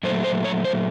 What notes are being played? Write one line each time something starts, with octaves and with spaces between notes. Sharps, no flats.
A#2 F#3 A3 C5
C5
C#5
C5